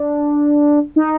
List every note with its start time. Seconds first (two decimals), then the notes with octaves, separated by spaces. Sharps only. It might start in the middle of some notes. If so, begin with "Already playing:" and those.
Already playing: D4
0.96 D#4